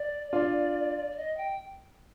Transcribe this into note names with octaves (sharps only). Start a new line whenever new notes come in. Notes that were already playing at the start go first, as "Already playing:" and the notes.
Already playing: D5
D4 F4 D5
D5
D#5
G5